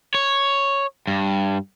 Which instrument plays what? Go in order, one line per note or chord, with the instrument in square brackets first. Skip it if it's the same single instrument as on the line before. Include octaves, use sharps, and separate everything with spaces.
[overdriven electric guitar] C#5
G2